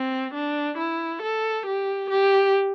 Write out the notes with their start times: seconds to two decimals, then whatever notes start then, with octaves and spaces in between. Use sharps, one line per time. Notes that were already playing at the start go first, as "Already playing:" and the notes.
Already playing: C4
0.34 D4
0.77 E4
1.22 A4
1.66 G4
2.10 G4